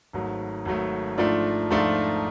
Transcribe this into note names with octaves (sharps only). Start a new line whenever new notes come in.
G#1 G#2 F#3 A3
G#1 G#2 F#3 A3
G#2 F3 A3 D4 F4
G#2 F3 A3 D4 F4